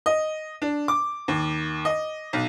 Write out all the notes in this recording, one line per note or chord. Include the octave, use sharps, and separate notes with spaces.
D#5
D4
D6
D#2
D#5
B1